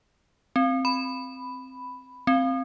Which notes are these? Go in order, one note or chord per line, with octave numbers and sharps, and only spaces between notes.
C4
B5
C4